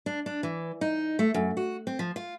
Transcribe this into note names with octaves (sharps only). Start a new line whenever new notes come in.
D4
D4
E3
D#4
A3
F#2
F#4
C4
F3
F4